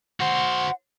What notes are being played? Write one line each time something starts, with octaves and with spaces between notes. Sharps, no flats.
F#4 C5 F#5